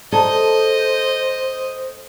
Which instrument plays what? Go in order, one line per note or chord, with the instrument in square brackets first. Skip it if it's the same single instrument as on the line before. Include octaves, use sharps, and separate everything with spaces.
[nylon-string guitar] A4 [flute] C5 [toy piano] D5 A5 A#5 [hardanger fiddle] D#5